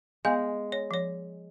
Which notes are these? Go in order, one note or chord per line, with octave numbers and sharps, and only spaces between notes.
G#3 B3 F5
C#5
F3 C#5